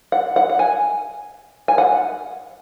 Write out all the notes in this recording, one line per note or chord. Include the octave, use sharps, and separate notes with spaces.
F#5
F#5
F#5
G#5
G#5
F#5